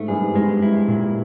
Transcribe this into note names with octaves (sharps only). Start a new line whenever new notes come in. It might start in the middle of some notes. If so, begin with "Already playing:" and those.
Already playing: G#2 A3
G2 G#4
G#2
G2 G#3
E4
A#2